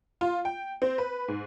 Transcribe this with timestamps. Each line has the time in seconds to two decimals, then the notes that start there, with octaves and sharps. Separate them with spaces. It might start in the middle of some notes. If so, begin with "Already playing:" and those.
0.21 F4
0.45 G5
0.82 C4
0.98 B4
1.28 G#2